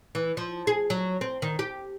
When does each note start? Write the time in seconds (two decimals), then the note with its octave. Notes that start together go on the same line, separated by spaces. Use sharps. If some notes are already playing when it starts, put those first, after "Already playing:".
0.15 E3
0.37 F3
0.67 G#4
0.90 F#3
1.21 C4
1.42 D#3
1.59 G4